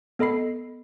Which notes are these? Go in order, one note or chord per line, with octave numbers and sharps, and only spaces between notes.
B3 A4 D#5 B5 C7